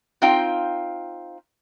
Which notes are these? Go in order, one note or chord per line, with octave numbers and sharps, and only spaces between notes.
C4 D#4 F4 F5 G5